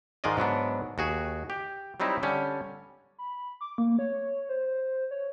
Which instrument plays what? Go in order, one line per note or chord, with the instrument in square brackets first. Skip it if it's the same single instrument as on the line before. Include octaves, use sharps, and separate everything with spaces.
[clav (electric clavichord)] G#2 D#3 G#3 F4 D5 D#5
G#2 F#3 B3 D4
D#2 F#4 G#4
G4
F#3 G3 C4 D#4 E4
D3 G3 C#4
[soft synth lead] B5
D6
A#3
C#5
C5
C#5